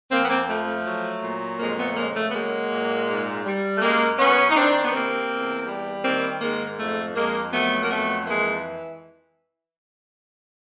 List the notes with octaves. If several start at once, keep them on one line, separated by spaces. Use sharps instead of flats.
F2 A#3 C4
B3
A#3 C4
F3 A3
A3
F#3
A#2
F2 G#3 A#3
A3 B3
C#3 G#3 A#3
A3
B3
F#3 G#3 A#3
A#2
G#2
G3
A3
F#2 G#3 A#3
F#2 B3 C#4
D#4
D#3 C4 D4
B3
C3 A#3 C4
E2
G3
D#3 A#3 C4
G#2 G#3 A#3
F2 A3
F2 G#3 A#3
F#3 A3 B3
A#3
F2 A3 B3
E3 G#3 A#3